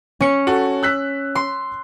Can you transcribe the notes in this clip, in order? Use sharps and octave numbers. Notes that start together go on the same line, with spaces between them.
C#4 C#7
F#4 A4
E6 F#6 B6
C6